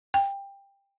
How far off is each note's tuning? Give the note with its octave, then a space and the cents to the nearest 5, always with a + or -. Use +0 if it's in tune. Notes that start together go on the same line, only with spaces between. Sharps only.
G5 +20